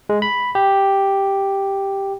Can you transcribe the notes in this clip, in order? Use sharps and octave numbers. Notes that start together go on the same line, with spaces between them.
G#3
B5
G4